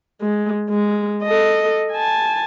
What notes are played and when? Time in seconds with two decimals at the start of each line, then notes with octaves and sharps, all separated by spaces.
0.22 G#3
0.69 G#3
1.23 A4 D#5
1.93 G#5 A5